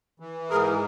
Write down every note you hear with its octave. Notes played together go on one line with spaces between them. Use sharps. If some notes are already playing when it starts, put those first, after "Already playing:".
E3
G#2 G#4 A#4